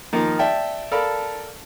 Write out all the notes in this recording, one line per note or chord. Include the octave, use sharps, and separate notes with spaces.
D#3 F3 A#3 D#4
D5 E5 G5 A5
A4 A#4 D5 F5 A5 B5